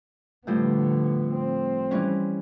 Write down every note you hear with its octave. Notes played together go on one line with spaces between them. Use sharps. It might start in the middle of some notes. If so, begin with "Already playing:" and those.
A2 D3 F3 G3 B3
C4
E3 G3 C#4